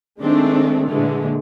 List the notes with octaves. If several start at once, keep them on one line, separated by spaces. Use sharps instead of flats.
D#3 G#3 A3 C4 D4
A#2 D3 E3 G#3 A3